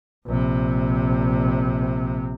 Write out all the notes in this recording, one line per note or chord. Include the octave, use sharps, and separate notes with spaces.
A#1 C3